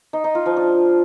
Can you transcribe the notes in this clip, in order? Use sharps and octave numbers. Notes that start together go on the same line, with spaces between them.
D#4
D#4
F4
F3
D4